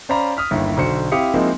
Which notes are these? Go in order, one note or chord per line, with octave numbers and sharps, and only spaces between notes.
C#4 C5 D5 F5 A#5 B5
D#6 F6 B6
G1 D#2 E4
B1 D3 F#4 C5 C#7
C4 E4 G4 F5 D#6 C#7
F3 G#3 A#3 C4 D#4 E4